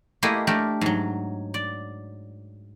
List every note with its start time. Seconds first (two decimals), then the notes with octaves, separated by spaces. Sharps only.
0.23 A3 A#3 E4 G4 G#4 D#5
0.47 A3 D4 G4 A#4
0.81 G#2 F#3
1.54 D5